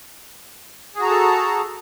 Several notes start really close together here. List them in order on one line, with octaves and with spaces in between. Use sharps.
G#4 F#4 A#5 A5 A4